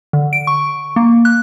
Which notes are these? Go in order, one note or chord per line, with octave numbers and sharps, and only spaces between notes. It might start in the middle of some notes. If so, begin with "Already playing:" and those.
D3
D7
C#6
A#3
F#6